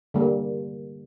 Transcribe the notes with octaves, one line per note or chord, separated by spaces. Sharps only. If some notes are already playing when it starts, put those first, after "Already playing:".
D3 G3 A#3